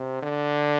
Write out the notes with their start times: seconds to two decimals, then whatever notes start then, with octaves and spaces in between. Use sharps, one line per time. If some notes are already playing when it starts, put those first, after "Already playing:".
Already playing: C3
0.23 D3